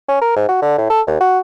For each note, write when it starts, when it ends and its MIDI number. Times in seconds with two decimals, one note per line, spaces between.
0.09 0.21 61
0.22 0.35 70
0.37 0.46 44
0.49 0.59 66
0.62 0.78 50
0.78 0.88 45
0.90 1.02 69
1.07 1.20 39
1.21 1.39 66